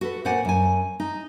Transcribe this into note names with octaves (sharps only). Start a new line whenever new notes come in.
F#4 A4 B4
A#2 C5 D5 F#5 G#5
F#2 G#5
D#4